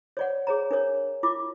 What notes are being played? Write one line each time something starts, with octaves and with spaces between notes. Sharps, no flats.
C#5 D5 F#5
G#4 C#5 A#5
D4 A#4 C#5
E4 F4 D6